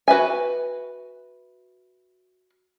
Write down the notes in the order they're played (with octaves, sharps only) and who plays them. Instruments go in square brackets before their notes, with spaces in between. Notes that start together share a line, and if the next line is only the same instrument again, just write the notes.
[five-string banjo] F#4 B4 E5 G#5